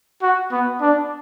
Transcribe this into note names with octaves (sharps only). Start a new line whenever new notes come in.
F#4
B3
D4